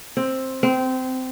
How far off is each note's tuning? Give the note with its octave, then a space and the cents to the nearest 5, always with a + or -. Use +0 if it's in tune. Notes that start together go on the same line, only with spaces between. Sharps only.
C4 +10
C4 -20